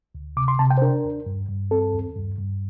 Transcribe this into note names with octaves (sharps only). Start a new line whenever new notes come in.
D2
C3 D6
C6
C3 A5
G5
C5
D4 A#4
D#2
G2
G2
C4 A4
D#2
G2
G2